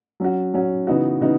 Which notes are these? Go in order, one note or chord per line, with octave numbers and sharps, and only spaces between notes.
F#3 C#4 F#4
F#3 C#4 F#4
C#3 E3 B3 D#4 F#4
C#3 E3 B3 D#4 F#4